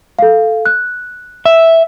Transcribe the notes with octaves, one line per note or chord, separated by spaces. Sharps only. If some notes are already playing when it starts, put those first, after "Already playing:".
A4 F5
F#6
E5